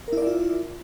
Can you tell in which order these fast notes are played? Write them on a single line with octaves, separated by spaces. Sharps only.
A#4 E4 D5 E5 F4